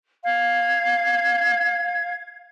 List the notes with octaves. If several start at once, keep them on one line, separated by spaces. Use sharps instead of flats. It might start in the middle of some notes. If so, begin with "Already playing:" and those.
F5 G#6